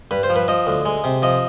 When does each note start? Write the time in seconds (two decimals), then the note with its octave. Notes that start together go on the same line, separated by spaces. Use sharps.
0.11 G2 B4
0.23 C5
0.30 F3
0.36 B4
0.48 F3 D#5
0.67 D2
0.85 G#3
1.04 C3
1.22 F3 D#5